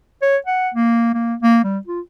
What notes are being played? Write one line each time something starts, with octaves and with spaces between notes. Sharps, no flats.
C#5
F#5
A#3
A#3
A#3
G3
F4